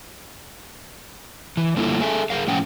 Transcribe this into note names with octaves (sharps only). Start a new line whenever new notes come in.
E3
D3 G3 A3 A#3 E4 F4
G#4 A4 E5 G#5
G#4 A#4 F5
A2 F3 C#4 F#5 G5